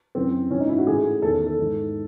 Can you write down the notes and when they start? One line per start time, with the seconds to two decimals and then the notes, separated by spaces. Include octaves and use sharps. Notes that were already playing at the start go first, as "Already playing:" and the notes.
0.15 F#2 E3 C4
0.51 G#2 E3 C#4
0.60 D#4
0.69 E4
0.78 F#4
0.87 A2 E3 G#4
1.22 E2 D#3 A4
1.34 A4
1.46 A4
1.58 G#2 E3